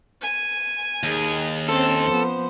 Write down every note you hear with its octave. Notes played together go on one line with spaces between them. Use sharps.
G#5
D#2 D#4 G#4
C4 C#4 A4 C5
F3 B3